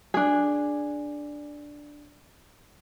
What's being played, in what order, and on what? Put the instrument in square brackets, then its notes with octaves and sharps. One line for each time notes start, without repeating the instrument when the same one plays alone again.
[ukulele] D4 G#4